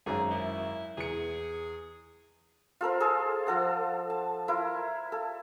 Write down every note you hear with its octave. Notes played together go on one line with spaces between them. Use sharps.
G#1 F#2 G#4 A#5
E4
E2 G#4 C#7
F4 A4 A#4 C5
G#4 A4 C5 A5
F3 A4 F#5
A5
E4 F4 A#4
A4